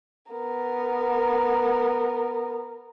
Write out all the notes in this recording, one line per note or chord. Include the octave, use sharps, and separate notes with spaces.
B3 A#4